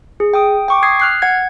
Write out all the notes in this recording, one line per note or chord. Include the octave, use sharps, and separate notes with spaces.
G#4
G5 D#6
G5 C#6 D6
D#6 G#6 C7
F6 F#6 C7
F#5 G#6